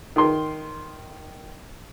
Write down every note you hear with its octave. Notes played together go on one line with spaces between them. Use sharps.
D#3 C6